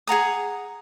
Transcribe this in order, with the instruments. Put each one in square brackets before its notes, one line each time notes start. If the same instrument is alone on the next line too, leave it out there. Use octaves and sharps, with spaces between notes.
[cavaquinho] G#4 F#5 A#5 D#6